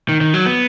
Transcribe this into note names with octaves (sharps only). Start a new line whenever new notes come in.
D#3
D#3
F#3
B3